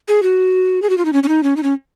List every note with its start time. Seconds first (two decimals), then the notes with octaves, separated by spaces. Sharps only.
0.08 G#4
0.23 F#4
0.82 G#4
0.90 F#4
0.98 F4
1.05 D#4
1.13 C#4
1.23 C#4
1.28 D#4
1.43 C#4
1.57 D#4
1.63 C#4